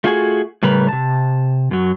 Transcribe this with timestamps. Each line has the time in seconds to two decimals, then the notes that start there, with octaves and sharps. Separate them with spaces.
0.04 A3 F4 F#4 G#4 G5 G#5
0.63 A2 C#3 G3 A#4 B4
0.89 C3 A5
1.71 F#2 F#3